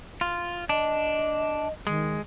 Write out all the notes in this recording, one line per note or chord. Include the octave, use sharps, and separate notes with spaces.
F4
D4 D#5
D#3 G#3